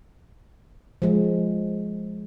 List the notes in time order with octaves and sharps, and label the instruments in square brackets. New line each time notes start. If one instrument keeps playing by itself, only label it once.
[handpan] F3 G#3